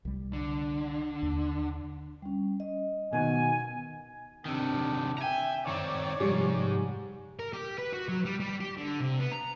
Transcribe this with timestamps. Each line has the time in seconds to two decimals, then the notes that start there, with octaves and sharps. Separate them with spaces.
0.05 C2 G3
0.33 D3
1.23 D#2
2.22 G3 C#4
2.60 D#5
3.13 B2 D#3 G#5
4.46 C3 D#3 C4 D4 E6
5.18 E5 G5 G#5 A#5
5.67 F#2 D#3 C4 C#5 D5
6.20 G#2 C3 F3 G3
7.40 A#4
7.53 G4
7.78 B4
7.93 F#4
8.09 F#3
8.25 G3
8.40 G3
8.61 G4
8.77 D3
9.00 C3
9.20 B3
9.33 A#5